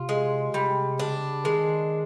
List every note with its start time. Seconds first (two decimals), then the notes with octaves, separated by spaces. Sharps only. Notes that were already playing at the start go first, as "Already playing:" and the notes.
Already playing: C3 F4
0.09 G#3
0.53 C3 G3
0.99 C#3 D4
1.45 D#3 G#3